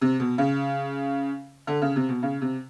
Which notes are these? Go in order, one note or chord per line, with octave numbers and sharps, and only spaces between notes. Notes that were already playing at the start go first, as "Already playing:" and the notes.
C3
B2
C#3
D3
C#3
C3
B2
C#3
C3